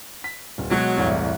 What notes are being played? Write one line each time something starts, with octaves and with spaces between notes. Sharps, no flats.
B6
D1
B2 F#3 G#3 F#6
E1 C2 A2